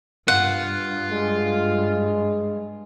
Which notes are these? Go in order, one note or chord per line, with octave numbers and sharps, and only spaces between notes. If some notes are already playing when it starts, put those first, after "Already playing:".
G2 F4 F#5
G#3